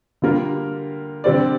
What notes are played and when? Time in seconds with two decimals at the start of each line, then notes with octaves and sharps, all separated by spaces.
0.22 D3 G3 A#3 F4 A#4
1.24 D3 G3 C4 G4 D5